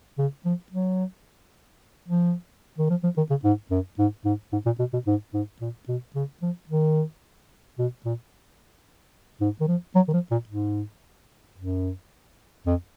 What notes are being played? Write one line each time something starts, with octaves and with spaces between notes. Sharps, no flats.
C#3
F3
F#3
F3
D#3
F3
F3
D#3
C#3
G#2
F#2
G#2
G#2
G#2
A#2
B2
B2
G#2
G#2
A#2
B2
C#3
F3
D#3
B2
A#2
G#2
D#3
F3
F#3
D#3
F3
A#2
G#2
F#2
F2